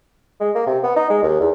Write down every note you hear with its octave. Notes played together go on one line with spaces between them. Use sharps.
G#3
A#3
C3
B3
D#4
G#3
D#2
E2